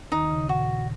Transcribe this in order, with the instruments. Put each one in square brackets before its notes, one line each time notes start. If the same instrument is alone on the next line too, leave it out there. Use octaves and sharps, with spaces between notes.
[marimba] D#2 D#3 [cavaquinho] D#4
[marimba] C#3
[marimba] A#2 [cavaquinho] F#4